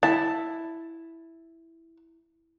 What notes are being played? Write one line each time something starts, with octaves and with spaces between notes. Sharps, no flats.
E4 A5